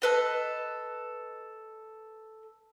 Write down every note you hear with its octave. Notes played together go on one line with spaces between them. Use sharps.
A4 B4 D#5